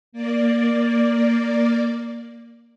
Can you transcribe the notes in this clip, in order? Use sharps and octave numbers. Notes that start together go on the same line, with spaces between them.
A#3 D5